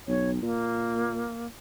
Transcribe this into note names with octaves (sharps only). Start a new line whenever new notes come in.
B1 C#5
A#2 A#3